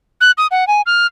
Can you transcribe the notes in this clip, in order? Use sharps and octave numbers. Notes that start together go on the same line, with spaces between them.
F#6
D#6
F#5
G#5
F6